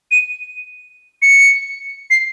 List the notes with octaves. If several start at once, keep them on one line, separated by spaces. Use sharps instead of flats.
D#7
C#7
C7